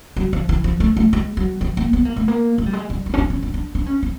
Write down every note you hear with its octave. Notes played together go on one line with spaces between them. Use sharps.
F#3
F3
E3
F3
A3
A3
G#3
F#3
F3
A#3
B3
A#3
A3
A#3
A3
G3
G#3
G3
G#3
C#4
D4
C#4
D4
D4
D4
C#4
C4